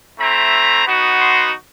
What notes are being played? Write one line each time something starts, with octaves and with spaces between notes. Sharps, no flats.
A3 C4 E4 A#5
B3 D#4 F#4
C6